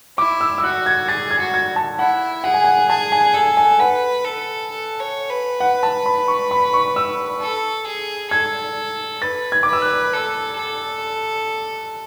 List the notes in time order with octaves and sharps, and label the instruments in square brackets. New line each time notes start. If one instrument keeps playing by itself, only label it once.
[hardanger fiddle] E4 [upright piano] D6
[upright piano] E6
E6
[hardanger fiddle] F#4 [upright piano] F#6
[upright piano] G#6
[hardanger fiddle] G#4 [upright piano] A6
[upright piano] G#6
[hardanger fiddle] F#4
[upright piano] G#6
A5
[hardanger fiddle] E4 [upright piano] F#5
[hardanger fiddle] G#4 [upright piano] F#5
[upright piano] G#5
F#5
[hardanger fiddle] G#4 [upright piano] A5
[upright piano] G#5
[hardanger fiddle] A4 [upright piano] G#5
[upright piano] G#5
[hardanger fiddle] B4 [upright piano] F#5
[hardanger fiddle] A4
A4
C#5
B4
[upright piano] F#5
A5
B5
C#6
B5
C#6
E6
[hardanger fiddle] A4
G#4
[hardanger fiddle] A4 [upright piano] G#6
[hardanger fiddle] B4 [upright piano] A6
[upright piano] G#6
[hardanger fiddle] B4 [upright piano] D6
[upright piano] E6
F#6
[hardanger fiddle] A4
A4